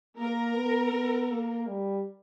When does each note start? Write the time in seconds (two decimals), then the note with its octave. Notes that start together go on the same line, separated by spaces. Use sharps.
0.18 A#3 A#4
0.56 B3
0.93 B3
1.30 A#3
1.67 G3